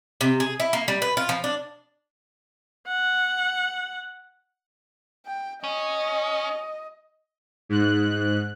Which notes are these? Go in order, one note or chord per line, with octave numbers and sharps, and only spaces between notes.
C3
G#4
E4
A#3
G3
B4
F4
F3
D4
F#5
G5
C#4 D#5
G#2 F#6